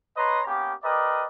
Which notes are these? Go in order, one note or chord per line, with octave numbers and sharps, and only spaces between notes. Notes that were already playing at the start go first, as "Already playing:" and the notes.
B4 C#5 D#5 A#5 C6
A#3 B3 C#4 G4
G4 A#4 B4 D5 D#5